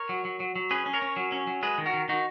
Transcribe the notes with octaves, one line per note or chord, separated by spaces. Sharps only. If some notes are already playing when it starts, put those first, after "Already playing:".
Already playing: A#4 C#5
F#3
F#3
F#3
F#3
C#4 G#4 B4
C#4
A#4 C#5
C#4
F#3
C#4
F#3
G#3 G#4 B4
D#3
F#4 A#4
D#3
D#3 D#4 F#4